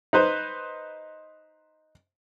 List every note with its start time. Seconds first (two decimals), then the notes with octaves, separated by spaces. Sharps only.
0.13 D#4 B4 C5